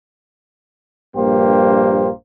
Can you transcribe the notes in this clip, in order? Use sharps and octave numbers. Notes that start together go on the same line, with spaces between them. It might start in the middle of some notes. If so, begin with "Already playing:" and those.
A#1 G2 A#3 G4 C5